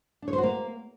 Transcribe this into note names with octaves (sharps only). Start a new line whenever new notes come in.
D4
C#5
C5
F#4
A#3